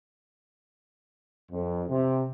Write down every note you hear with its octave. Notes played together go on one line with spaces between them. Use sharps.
F2
C3